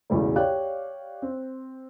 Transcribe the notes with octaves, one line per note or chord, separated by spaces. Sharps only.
B1 E2 A2 C#3
G4 C#5 D5 F5 G5 F#6
C4